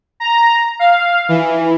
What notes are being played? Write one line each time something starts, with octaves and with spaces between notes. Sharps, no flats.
A#5
F5
E3